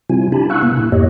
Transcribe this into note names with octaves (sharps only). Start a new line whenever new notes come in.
C3 G3 C4 E4 F4 G#5
D4 E4 G4 G#5 A5 B5
F5 F#5 G#5 C#6 E6 F#6
C3 A#3 B3
A#2 E4
F2 G#2 A#3 G4 C#5 D#5